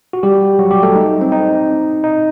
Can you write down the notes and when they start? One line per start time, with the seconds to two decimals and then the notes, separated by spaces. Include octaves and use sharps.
0.13 F#4
0.23 G3 G4
0.59 F#3 F#4
0.71 G3 G4
0.83 A3 A4
0.96 D#4
1.21 C4
1.32 D#4
2.04 D#4